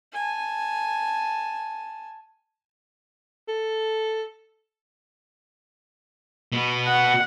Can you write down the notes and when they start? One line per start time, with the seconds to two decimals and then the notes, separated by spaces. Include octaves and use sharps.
0.13 G#5 A5
3.48 A4
6.52 B2 B3
6.88 F#5